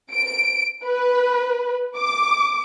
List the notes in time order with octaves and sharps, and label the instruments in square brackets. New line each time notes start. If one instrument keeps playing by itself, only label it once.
[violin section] D7
B4
D6